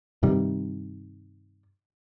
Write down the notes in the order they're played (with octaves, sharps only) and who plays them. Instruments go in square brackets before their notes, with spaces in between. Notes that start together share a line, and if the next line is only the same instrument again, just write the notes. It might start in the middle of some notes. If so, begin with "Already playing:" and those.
[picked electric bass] G2 C3 D#3 G3